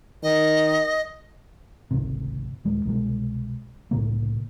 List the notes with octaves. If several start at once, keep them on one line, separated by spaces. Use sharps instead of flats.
D#3 D#5
G#1 C#2 C3
D#1 G#3
C2 B2 G#3
C2 A2 C#3 A#3